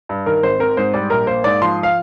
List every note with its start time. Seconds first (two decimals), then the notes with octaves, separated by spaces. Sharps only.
0.09 G2
0.26 D#3 A#4
0.43 G#1 C5
0.60 C4 A#4
0.77 G#2 C5
0.94 G3 D5
1.10 A#1 A#4
1.27 A#3 C5
1.44 G#2 D5
1.62 F3 C6
1.83 F5